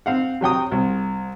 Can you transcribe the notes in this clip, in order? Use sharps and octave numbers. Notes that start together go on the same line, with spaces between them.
C4 F5 F#5
C3 F#3 G5 D#6
C2